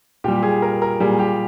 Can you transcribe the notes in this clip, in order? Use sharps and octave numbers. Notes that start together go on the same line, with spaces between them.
A#2 G3 G4
G#4
A#4
A#4
A#2 G3 G#4
G4